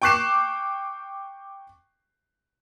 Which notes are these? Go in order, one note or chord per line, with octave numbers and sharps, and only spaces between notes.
G5 C#6 D6 F#6 C7 E7